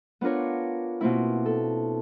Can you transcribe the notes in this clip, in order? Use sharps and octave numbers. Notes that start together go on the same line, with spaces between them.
B3 D4 F4 A#4 C#5
B2 A#3 C4 E4
A4